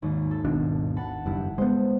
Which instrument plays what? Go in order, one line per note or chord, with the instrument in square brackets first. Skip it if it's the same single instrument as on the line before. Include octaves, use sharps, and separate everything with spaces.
[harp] G#1 D#2
A4
[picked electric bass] G#1 B2 D4
[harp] F#5 A5 B5
[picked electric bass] F#1 G2 [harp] E4
[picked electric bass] G#3 B3 [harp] C5